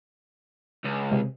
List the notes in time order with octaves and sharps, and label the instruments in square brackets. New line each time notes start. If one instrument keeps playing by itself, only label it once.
[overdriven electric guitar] C#2
[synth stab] C3 G#3